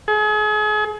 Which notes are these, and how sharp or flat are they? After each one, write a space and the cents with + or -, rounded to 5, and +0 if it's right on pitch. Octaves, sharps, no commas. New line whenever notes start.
G#4 +35